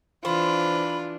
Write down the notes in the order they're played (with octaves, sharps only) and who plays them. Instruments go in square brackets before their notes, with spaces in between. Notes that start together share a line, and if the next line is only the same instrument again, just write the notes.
[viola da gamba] E3 D4 [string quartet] F4 [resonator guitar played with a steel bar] C5 [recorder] B5